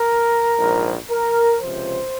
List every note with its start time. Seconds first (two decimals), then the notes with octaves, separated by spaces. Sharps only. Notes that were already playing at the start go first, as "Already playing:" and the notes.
Already playing: A#4
0.56 A#1 G#2 F3
1.09 A#4
1.62 C#2 C3 F3 C5